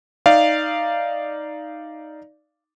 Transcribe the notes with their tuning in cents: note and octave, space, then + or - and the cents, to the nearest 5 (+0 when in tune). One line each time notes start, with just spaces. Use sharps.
D#4 +0 D5 +0 F5 -15